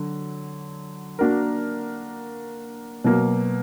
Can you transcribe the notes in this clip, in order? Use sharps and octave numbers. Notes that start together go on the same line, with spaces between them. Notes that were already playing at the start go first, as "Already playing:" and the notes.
Already playing: D3 F#3
A#3 D4 F#4 A#4
B2 F#3 A#3